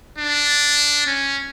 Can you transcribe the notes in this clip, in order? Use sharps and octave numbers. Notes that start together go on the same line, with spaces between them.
D4
C#4